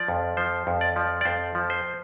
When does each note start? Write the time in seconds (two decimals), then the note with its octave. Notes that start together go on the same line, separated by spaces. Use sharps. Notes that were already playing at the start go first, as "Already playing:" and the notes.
Already playing: F3 D5
0.08 F2
0.37 F3 C5
0.67 F2
0.81 D5
0.96 F3
1.21 D5
1.25 F2 C5
1.55 F3
1.70 C5